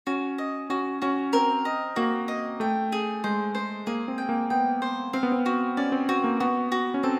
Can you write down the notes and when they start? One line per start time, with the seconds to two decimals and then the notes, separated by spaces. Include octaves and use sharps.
0.07 C#4 F#4
0.38 D#5
0.70 C#4 F#4
1.02 C#4 F#4
1.33 C4 A#4
1.65 D#5
1.96 A#3 F#4
2.28 D#5
2.60 A3 G5
2.92 G#4
3.24 G#3 C5
3.55 C5
3.87 A#3 G#4
4.08 C4
4.18 G5
4.29 A#3
4.50 B3 G5
4.82 C5
5.13 C4 F5
5.23 B3
5.32 C4
5.46 F#4
5.77 C#4 D5
5.92 C4
6.09 C4 F#4
6.24 A#3
6.40 B3 F#4
6.72 F#4
6.94 C#4
7.03 C4 A4